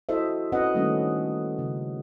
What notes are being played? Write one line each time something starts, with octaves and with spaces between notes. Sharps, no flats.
E4 F#4 A4 C5 D#5 E5
C4 C#4 F#4 B4 D#5 F#5
D#3 G3 A3 A#3 C#4 D4
C#3